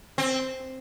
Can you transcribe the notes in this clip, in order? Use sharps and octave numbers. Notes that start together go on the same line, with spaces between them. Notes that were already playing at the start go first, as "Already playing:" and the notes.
C4